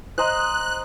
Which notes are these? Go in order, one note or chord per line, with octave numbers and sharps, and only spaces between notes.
C5 D#5 A#5 F#6